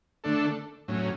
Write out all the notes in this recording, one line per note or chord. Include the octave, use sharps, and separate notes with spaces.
D3 A3 D4 A4
A2 F#3 C#4